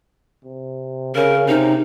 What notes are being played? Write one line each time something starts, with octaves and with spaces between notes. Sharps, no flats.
C3
C#3 A#4
C3 D#4